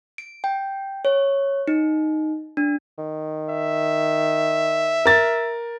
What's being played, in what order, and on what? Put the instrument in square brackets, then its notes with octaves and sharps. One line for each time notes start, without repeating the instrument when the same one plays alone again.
[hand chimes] D7
G5
C#5
D#4
D4
[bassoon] D#3
[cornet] E5
[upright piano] A#4 A6